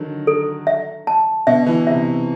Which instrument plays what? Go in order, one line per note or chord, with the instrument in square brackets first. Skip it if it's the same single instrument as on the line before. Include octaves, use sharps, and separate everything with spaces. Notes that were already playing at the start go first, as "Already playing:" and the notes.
Already playing: [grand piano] D3 D#3 F#3
[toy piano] A4
E5
A5
[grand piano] B2 [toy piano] E5
[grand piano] E3
[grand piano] C3 [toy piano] E5